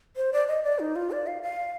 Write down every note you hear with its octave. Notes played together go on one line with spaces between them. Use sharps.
C5
D5
D#5
D5
D#4
F4
D5
F5
F5